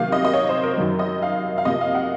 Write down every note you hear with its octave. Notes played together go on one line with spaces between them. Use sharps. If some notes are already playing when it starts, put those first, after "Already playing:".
Already playing: C3 D#3 F#3 A#3 F5
D#5
D#5
C#5
C5
A#4
F#2 D#3 F#3
D#5
F5
F5
C3 F3 A#3 D#5
F5
F#5